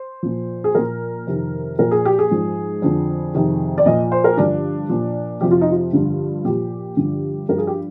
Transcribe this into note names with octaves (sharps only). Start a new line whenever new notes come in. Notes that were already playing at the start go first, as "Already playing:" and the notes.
Already playing: C5
A#2 F3
G#4
A#2 F3 A#4
F2 C3 D#3
A#2 F3 A#4
G#4
G4
G#4
G#2 F3
F2 D3 F3
F2 C3 D#3
D5
A#2 F3 D#5
C5
A#4
G2 D3 F3 D4
A#2 F3
F2 C3 F3 G4
F4
D#4
F4
G2 D3 F3
A#2 F3 G4
G2 D3 F3
G2 F3 A#4
G#4
G4